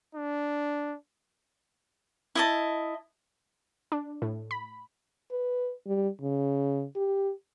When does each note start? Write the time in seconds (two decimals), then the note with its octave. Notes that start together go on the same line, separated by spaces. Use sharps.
0.15 D4
2.35 E4 D#5 A5
3.92 D4
4.22 A2
4.51 B5
5.31 B4
5.87 G3
6.22 C#3
6.96 G4